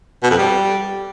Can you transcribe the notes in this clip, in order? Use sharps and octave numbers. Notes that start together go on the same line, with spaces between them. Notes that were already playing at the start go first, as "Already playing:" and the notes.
B2
F2
G3